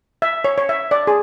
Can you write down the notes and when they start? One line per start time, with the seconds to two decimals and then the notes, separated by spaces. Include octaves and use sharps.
0.22 E5
0.44 C#5
0.58 C#5
0.69 E5
0.91 D5
1.07 G#4